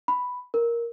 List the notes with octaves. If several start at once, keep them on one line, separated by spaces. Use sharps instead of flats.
B5
A#4